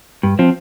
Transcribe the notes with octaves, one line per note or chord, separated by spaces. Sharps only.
G2
F3 C4